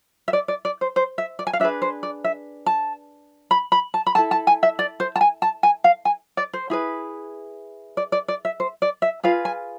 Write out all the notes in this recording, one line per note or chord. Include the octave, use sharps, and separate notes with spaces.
E5
D5
D5
D5
C5
C5
E5
D5
G#5
F5
D4 G#4 B4 E5
C5
D5
E5
A5
B5
B5
A5
B5
E4 A4 A5
A5
G#5
E5
D5
C5
A5
G#5
A5
G#5
F5
G#5
D5
C5
E4 G#4 B4
D5
D5
D5
E5
C5
D5
E5
F4 G#4 B4 F5
G#5